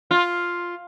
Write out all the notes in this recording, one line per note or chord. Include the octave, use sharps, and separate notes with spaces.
F4